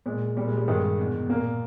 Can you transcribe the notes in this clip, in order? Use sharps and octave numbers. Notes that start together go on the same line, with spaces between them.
A#2 G#3
A#2 G3
G#3
G3
G2 D#3 G#3
E2 B2
A#2 A#3